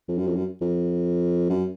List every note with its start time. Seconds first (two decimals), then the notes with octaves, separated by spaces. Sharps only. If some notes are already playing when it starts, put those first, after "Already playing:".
0.08 F2
0.18 F#2
0.27 F2
0.35 F#2
0.61 F2
1.50 F#2